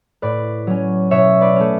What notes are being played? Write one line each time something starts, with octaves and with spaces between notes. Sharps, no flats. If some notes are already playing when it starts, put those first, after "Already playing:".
A2 B4 D5
F#3 C#4
B2 C#5 E5
B4 D5
A3 C#4